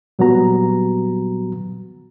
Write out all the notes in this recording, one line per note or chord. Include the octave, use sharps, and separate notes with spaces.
A#2 F#3 G3 B3 F#4 A#5